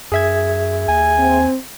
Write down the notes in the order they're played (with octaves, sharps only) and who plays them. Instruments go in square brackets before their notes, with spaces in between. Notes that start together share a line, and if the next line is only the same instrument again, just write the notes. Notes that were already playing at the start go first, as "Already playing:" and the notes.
[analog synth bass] F#2 [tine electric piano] G#4 E5 G#6
[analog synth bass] D#2 [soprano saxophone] G#5
[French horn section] C4